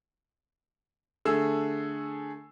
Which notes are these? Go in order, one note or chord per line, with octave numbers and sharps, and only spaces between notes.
D3 A3 G#4 E6